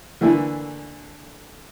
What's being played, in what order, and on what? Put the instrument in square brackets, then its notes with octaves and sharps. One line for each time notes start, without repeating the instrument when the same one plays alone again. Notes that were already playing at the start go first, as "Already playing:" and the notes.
[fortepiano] D3 E3 A3 A#3 E4 G#5